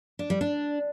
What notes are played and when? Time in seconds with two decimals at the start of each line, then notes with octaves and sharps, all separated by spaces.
0.19 D4
0.30 G3
0.41 D4